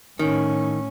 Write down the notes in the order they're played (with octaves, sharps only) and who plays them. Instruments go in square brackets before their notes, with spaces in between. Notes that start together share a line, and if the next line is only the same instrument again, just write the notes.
[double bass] A2 C#4 [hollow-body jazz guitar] D#3